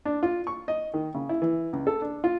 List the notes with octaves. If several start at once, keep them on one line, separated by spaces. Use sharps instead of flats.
D4
F4
C#6
D#5
D#3
C#3
E4
E3
C#2
A4
D4
F4